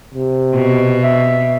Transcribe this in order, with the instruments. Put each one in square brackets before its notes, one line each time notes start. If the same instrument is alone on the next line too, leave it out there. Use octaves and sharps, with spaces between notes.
[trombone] C3
[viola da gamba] B2
[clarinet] E5